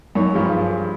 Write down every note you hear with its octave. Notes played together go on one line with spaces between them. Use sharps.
F#2 D#4 C#5
G2 F3 G#3 G4